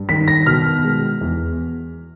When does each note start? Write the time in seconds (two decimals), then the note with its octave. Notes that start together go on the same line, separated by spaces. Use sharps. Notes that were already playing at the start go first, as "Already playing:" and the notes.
Already playing: G2
0.09 D#3 B6
0.28 A#6
0.46 B2 F6
0.83 G#3
1.21 E2